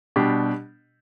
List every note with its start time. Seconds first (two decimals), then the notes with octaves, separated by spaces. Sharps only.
0.16 B2 G3 D4 G4